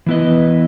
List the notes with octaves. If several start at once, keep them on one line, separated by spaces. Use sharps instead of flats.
E3 B3 E4 B4 D#5